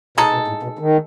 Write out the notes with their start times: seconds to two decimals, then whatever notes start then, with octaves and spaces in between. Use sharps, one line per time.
0.18 B2 G#3 D#4 A4
0.33 B2
0.48 A2
0.63 B2
0.79 D#3